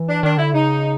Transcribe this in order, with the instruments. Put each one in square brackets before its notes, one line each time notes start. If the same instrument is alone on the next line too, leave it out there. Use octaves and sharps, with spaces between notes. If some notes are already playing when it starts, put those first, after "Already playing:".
Already playing: [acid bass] E3
[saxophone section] D4
[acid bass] D#3 [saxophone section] D4
[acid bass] D3 [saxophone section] E4
[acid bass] C#3 [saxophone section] D#4